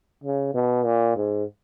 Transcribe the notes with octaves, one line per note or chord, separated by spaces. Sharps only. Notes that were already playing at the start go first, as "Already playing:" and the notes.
C#3
B2
A#2
G#2